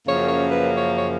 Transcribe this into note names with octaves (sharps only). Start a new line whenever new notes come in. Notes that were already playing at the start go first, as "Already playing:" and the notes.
F#2 C#3 F3 A#3 C#5
C#5
B4
C#5
C#5